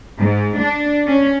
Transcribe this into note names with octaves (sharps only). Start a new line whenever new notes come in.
G#2
D4
C#4